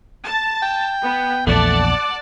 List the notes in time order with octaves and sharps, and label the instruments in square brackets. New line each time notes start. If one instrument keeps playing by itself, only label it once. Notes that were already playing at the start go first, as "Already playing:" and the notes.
[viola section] A5
[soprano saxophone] G5
[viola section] B3
[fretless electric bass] A#1 E2 [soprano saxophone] A3 [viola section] D5 F#5 A5
[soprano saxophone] D6